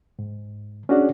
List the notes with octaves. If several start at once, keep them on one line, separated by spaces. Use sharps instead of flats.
G#2
C#4 D4 F#4 G#4 D5